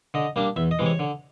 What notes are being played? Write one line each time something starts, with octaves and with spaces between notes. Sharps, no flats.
D3 D#5
G3 A#3 D4
E2 E5
D#5
C3 E3 G#3
C#5
D3